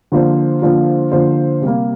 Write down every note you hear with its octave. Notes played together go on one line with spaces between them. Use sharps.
D3 F3 A#3 F4 C5
D3 F3 A#3 F4 C5
D3 F3 A#3 F4 C5
C3 G3 A#3